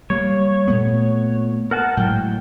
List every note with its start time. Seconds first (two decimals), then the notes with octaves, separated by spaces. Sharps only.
0.10 G3 A#3 C#5
0.67 A#2 A3 B3
1.71 A#4 F#5 A5
1.97 A2 F#3 G#3 G5